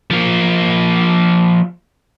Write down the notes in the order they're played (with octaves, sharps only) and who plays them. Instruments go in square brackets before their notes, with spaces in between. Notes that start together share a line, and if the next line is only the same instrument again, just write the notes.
[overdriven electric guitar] F3 A#3